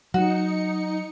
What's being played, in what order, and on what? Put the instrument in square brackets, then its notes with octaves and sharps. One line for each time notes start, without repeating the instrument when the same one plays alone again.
[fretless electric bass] F#3 [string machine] D#4 C#7 [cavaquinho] F#4